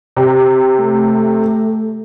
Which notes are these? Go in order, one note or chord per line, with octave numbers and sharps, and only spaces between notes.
C3 G4
A3